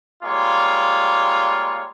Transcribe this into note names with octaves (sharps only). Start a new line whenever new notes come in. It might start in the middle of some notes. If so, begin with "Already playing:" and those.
G3 G#3 A#3 F4 C#5